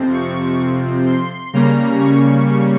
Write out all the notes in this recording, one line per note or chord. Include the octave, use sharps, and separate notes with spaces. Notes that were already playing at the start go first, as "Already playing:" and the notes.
Already playing: F2 C3 F3 C4
C#6
C6
C#3 G3 A#3 C#4 A#5
C#6
C#6